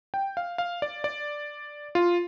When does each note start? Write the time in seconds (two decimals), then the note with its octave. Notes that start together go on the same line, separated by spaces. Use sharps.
0.14 G5
0.37 F5
0.58 F5
0.82 D5
1.04 D5
1.95 F4